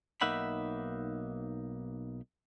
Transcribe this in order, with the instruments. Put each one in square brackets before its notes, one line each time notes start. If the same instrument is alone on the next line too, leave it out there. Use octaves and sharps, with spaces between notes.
[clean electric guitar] B1 A#3 D#4 E5 F#5 B5